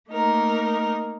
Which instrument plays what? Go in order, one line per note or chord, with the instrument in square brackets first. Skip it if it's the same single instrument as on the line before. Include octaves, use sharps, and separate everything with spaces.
[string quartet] A3 A#3 D#4 A#4